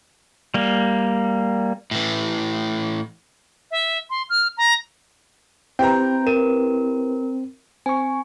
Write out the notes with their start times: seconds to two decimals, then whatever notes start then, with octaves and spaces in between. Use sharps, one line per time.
0.54 G3 A#3
1.91 A2 E3
3.71 E5
4.10 C6
4.30 F6
4.57 A#5
5.79 C4 E4 G4 B4 G5 A#5 G6
6.27 A#4 D#7
7.86 C4 G#5 C#6